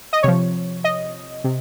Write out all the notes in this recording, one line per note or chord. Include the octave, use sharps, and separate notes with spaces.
D#5
C3 F3 C#5
D#5
C3